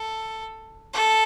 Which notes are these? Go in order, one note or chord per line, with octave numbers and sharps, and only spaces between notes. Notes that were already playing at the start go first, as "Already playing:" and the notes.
Already playing: A4
A4